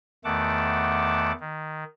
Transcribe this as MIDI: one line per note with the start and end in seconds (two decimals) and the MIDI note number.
0.24 1.32 40
0.24 1.32 51
0.24 1.32 57
0.24 1.32 78
0.24 1.32 81
0.24 1.32 86
1.40 1.84 51